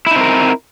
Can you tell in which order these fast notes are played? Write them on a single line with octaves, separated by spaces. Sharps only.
E4 D#4 C4 A#4